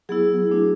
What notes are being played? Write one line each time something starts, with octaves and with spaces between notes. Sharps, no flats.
F#3 B3 E4 G#4
A3 D4 F#4